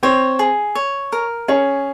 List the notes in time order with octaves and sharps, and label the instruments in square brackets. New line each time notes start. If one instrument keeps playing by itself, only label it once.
[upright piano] C4 C5 [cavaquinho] C#5
[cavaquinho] G#4
C#5
A#4
[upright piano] C#4 C#5 [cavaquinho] G#4